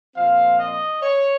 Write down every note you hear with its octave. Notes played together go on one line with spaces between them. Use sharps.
A#2 F3 C4 F5
D#5
C#5